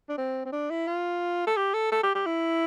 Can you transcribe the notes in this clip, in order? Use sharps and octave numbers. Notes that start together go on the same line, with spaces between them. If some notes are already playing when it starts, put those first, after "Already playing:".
D4
C4
C4
D4
E4
F4
A4
G4
A4
A4
G4
G4
E4